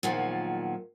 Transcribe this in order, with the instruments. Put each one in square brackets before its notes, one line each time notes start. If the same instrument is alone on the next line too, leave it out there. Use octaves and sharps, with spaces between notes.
[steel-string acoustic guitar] E2 A#2 D#3 F3 F#3